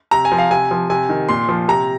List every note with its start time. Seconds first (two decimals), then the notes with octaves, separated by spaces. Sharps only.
0.11 C3 A#5
0.25 G#5
0.32 F3
0.38 F5
0.51 C3 G#5
0.71 F3
0.90 C3 G#5
1.09 D#3
1.29 A#2 C6
1.49 F3
1.68 C3 A#5